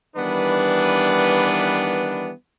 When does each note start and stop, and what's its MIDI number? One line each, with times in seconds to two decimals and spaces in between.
0.17 2.31 51
0.17 2.31 52
0.17 2.31 55
0.17 2.31 59
0.17 2.31 62
0.17 2.31 71